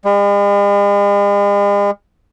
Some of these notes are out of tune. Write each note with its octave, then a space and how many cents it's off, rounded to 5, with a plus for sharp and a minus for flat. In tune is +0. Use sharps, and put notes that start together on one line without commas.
G#3 -45